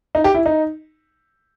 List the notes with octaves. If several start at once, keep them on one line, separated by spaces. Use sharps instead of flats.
D#4
G4
E4
D#4